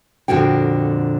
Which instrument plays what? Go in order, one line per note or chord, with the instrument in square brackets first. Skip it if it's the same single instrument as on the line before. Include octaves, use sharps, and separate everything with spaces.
[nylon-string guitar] F2 A#2 D3 F#4 G5